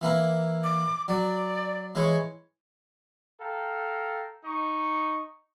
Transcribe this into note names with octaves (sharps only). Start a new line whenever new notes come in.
E3 A#3 E4
D6
F#3 D5
E3 G#3 C#5
A4 F5 G5 A#5
D#4 C#6